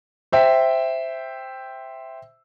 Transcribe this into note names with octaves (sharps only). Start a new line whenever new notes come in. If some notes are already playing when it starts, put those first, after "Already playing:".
C5 E5 G5